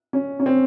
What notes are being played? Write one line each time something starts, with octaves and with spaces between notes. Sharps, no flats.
C#4
C#4
C4